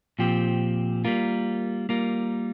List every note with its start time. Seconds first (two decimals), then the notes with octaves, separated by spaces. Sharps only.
0.19 A#2 F3 C4 G4
1.05 G3 A#3 F4 A#4
1.89 G3 A#3 F4 A#4